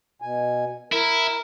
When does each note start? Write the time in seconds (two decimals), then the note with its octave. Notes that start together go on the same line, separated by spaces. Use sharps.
0.22 B2 G#5
0.92 E4 A#4